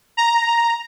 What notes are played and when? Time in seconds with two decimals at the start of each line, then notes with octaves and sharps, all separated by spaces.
0.17 A#5